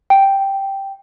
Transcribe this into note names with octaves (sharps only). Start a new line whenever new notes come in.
G5